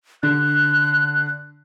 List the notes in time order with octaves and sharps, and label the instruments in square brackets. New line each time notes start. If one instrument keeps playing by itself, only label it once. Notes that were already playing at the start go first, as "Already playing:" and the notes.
[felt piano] D3 D4 [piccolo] F#6